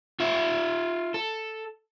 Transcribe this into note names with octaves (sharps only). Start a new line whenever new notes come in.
F4 E5
A4